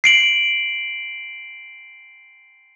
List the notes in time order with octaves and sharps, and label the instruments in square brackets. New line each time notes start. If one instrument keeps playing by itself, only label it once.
[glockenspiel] C7 D7 F#7